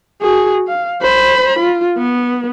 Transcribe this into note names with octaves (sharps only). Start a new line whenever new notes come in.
F#4 G#4
F5
C5 B5
F4
B3